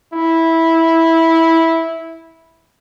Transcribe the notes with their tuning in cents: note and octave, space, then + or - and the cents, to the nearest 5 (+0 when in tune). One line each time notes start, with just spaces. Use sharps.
E4 -10